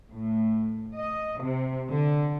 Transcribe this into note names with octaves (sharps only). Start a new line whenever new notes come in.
A2
D#5
C3
D3